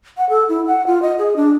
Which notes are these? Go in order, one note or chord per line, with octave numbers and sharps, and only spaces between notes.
F#5
A4
E4
F#5
F4
D#5
G#4
D4